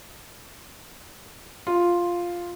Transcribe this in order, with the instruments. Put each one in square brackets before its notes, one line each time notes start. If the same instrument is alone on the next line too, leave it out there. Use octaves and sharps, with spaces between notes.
[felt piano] F4